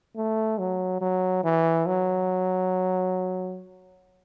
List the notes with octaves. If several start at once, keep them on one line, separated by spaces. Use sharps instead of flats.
A3
F#3
F#3
E3
F#3